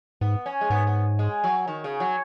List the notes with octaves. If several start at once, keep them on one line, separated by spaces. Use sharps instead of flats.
G#2 B3
C#4
G#3
G#2 B3
B3
G#3
F#3
D#3
C#3
F#3